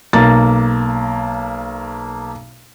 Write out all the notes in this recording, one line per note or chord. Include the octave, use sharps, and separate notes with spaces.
B1 A#3 A6